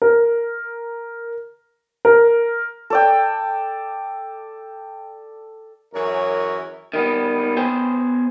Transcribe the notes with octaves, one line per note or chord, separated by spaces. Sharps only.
A#4
A#4
A4 D5 G5
F#2 E3 G#4 A#4 C#5
D#3 G3 B3
B3 G#4 C5 G5